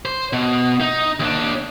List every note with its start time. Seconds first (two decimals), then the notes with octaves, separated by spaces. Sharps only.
0.05 C5
0.33 B2
0.81 D#4
1.20 D#2 D4